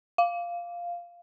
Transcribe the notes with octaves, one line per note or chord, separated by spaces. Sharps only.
F5